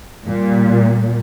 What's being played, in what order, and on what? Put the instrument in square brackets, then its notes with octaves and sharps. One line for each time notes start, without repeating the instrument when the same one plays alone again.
[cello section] A#2 G3